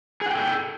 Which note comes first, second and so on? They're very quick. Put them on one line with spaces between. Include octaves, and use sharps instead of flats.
G#4 F#5 G5 A4